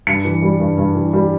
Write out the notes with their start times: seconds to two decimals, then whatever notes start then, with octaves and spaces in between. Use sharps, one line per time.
0.07 G2 C#7
0.25 E3
0.42 G3
0.60 G2
0.78 G2
0.95 E3
1.13 G3